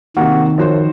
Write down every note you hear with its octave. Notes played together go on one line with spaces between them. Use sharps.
C3 D#3 A#3 F#4
F#2 F3 F#4 C5